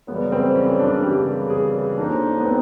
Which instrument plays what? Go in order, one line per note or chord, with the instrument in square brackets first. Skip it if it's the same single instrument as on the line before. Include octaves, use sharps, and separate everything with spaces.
[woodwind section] F#2 C#3 E3 G3 [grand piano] B3
[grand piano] C4
C#4
D4
[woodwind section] F#2 C#3 E3 G3 [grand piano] G4
[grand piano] G#4
[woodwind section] F#2 D3 F3 A#3 D#4 [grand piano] D4
[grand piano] B3
C4